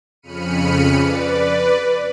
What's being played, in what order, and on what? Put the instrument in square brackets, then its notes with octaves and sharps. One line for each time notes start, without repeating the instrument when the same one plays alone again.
[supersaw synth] F2 C#3 B5 F6 C#7 D#7
B4 D5